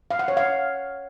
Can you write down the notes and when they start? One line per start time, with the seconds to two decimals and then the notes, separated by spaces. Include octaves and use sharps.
0.11 F5
0.19 F#5
0.28 C#5
0.37 F5